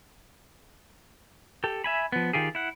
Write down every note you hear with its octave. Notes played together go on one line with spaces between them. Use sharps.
G4 A4
E5 G#5 B5
F3 B3
D#3 F4 G4 G#4
E4 F#5